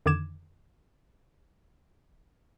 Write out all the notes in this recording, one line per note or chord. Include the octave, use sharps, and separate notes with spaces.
F2 D3 D#3 D6 G#6 E7